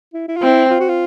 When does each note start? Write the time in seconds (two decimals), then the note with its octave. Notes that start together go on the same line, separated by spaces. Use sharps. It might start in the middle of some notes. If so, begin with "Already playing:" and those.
0.14 E4
0.28 E4
0.37 F4
0.42 C4 E4
0.70 F4
0.80 F#4
0.89 F4